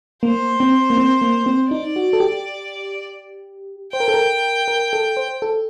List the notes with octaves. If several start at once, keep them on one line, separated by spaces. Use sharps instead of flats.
A#3 C5
C4
A#3
C4
A#3
C4
D#4 D5
F#4
A4
G4
C5 G5
A#4
A4
A#4
A#4
A4
C5
A4